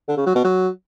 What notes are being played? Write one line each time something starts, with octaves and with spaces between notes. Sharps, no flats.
D3
C#3
F#3
B2
F#3